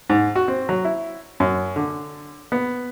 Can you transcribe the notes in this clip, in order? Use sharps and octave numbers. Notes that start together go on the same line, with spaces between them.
G#2
F#4
C4
F#3
E4
F#2
D3
B3